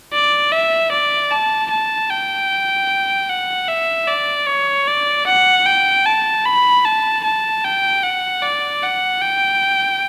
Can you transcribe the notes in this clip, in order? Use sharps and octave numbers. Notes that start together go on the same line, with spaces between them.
D5
E5
D5
A5
A5
G5
F#5
E5
D5
C#5
D5
F#5
G5
A5
B5
A5
A5
G5
F#5
D5
F#5
G5